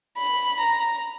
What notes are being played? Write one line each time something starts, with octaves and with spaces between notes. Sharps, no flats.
B5
A#5